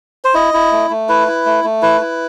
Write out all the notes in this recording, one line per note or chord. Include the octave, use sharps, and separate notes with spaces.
C5
E4 D#5
E4
A3
A3
E4 B4
E4
A3
A3
E4 B4
E4